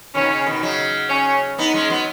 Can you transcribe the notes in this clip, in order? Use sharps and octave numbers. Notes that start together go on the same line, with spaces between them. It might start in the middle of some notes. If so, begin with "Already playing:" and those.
B2 D#3 C#4
C#3
B2 D#3
C#3 F#3
C#4
B3 D#4
G#3 C#4
F#3 B3